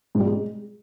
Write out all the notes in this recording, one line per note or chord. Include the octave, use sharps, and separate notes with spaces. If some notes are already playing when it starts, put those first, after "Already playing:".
G#2
G3
G#3